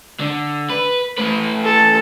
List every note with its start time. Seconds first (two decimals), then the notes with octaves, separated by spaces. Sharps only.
0.20 D3
0.70 B4
1.18 A2 B4
1.64 A4